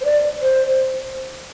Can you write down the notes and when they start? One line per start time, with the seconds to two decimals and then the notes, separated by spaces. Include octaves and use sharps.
0.01 C5
0.05 D5
0.42 C5